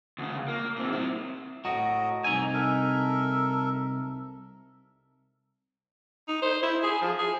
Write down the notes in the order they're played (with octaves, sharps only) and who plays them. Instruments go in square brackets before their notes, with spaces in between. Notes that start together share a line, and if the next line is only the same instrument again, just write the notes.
[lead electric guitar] D2 C#3
A#3
A#2 C4
C4 E4
[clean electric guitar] A2 F#4 [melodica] D#5 A#5
[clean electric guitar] C2 D#4 G#5 [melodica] E6
[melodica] A4 A#4 E5
[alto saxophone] D#4
C5
E4
G#4
F3
G#4